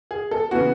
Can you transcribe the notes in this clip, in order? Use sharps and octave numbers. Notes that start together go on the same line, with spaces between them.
G#4
A4
C#3 E3 B3 F#4